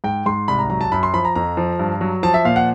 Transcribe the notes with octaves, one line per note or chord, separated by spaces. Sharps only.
G#2 G5
G#2 C6
C2 B5
A#5
F#3 A#5
A5
F#2 B5
C6
F3 B5
A#5
F2 A#5
F3
G2
F#3
F3 A5
E5
A#2 F5
F#5